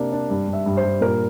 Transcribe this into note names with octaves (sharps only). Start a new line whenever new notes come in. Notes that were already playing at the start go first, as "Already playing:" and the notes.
Already playing: C3 A#3 D4
D4
G2
G2
E5
G2
C5
G2
A#2 A#4